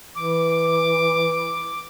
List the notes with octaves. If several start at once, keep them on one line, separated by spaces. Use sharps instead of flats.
E3 D6